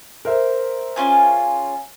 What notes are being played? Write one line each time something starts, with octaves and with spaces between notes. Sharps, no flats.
A#4 C5 E5
C#4 F4 G#4